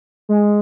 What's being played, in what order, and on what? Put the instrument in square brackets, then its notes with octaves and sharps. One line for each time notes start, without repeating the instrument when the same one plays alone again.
[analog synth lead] G#3